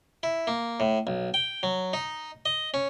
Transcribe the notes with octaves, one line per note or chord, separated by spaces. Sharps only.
E4
A#3
A2
B1
G5
F#3
D#4
D#5
C#4